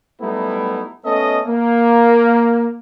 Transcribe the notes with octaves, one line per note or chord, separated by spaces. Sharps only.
F#3 G3 A3 B3 D#4 E4
A3 B3 C#4 A4 D#5
A#3